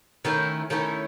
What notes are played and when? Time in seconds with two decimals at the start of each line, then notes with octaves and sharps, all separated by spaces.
0.25 D#3 A3 C#4 E4
0.70 D#3 A3 C#4 E4 A4